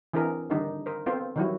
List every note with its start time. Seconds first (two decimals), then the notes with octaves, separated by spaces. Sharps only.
0.13 E3 C4 D4 G#4 A#4
0.50 D3 D#3 G3 D4 D#4
0.86 A#4 C5
1.06 B3 C4 F4 A4 C5
1.36 D#3 E3 F#3 G3 E4 F#4